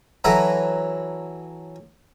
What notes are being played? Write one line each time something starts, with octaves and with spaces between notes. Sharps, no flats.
E3 F#3 A4 B4 A#5